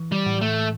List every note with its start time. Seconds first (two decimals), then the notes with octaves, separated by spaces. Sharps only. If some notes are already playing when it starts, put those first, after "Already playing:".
Already playing: E3
0.12 G3
0.26 A2
0.41 A3